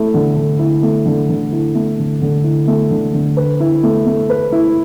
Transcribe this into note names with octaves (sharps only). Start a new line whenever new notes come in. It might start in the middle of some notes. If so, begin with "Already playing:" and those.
Already playing: A3 E4
D3
D3
E4
A3
D3
D3
E4
A3
D3
D3
E4
A3
D3
D3
B4
E4
A3
A3
B4
E4